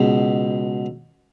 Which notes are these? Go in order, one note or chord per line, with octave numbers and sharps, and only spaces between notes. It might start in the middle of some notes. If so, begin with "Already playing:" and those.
Already playing: C#2 B2